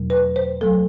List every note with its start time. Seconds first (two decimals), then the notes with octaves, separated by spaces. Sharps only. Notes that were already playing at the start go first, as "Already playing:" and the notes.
Already playing: E2 B2 F#3 A3
0.10 B4
0.36 C5
0.61 F#3 A3 A4